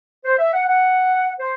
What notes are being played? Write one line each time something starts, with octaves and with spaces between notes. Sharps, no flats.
C5
E5
F#5
F#5
C5